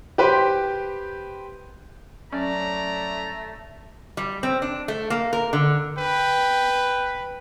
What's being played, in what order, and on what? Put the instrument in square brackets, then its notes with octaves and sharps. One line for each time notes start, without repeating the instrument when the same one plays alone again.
[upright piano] G4 B4 C5 G5
[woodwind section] F#3 D5 [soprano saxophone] A3 [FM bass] C#4 [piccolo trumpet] A#5
[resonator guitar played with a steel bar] G3
C4
D4
A3
A#3
A#4
D3
[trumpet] B4 [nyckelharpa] G5